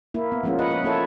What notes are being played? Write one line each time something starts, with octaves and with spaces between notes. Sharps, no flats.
A#3 E4
B3
F3 G#3 A#3 C#4 F4
B4 D#5 F#5
B4
A#3 E4 F4 A4 C#5